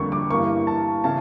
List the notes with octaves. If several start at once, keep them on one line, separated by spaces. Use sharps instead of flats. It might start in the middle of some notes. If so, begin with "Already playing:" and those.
Already playing: F2 D3 G3 A#3 C#6
D6
G2 E3 A#3 C#6
A5
C#3 E3 A5